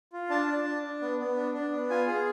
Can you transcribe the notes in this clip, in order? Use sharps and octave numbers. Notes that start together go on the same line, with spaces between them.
F4
D4 A5
D4
D4
D4
B3
B3
D4
D4
B3
F4 G#5
G#4